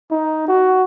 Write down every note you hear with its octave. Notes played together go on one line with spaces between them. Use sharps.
D#4
F#4